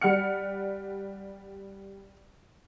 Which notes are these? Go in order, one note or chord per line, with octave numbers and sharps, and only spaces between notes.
G3 F#5 F6 C#7